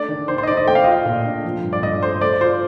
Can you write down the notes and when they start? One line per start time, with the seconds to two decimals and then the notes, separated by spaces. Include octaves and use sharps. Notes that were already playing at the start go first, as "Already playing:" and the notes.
Already playing: A3 D4 D5
0.08 D#3
0.28 D#3 C5
0.38 C5
0.43 D#5
0.47 D#4 D5
0.57 D#5
0.67 A3 G5
0.75 F5
0.84 F4 D#5
0.92 F5
1.05 A#2
1.25 D4
1.45 F3
1.64 G2
1.73 D5
1.83 G2 D#5
2.02 A3 C5
2.21 A3 D5
2.41 F4 C5